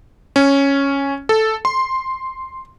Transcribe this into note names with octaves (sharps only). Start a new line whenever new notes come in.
C#4
A4
C6